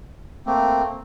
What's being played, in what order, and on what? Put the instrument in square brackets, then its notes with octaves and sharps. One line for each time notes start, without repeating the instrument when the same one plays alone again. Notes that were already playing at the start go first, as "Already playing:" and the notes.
[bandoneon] A3 A#3 C4